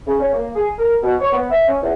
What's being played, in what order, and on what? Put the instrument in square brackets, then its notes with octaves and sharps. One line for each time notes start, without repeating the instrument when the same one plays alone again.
[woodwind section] C#3
C#4
A#3
G#4
A#4
B2
C#5
B3
E5
C#4
E2